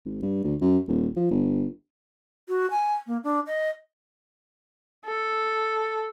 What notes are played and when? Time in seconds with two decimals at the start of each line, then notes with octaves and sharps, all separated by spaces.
0.05 G#1
0.22 G2
0.44 D2
0.61 F#2
0.88 D#1
1.16 F3
1.31 G1
2.49 F#4
2.71 G#5
3.07 A#3
3.24 D4
3.46 D#5
5.06 A4